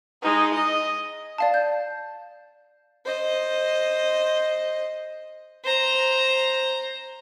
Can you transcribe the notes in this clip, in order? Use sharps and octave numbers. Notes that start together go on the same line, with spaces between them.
G#3 D#4
D#5
D5 F5 A5
G6
C5 D#5
C5 A#5